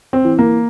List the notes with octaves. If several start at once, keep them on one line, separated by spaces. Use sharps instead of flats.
C4
E3
A#3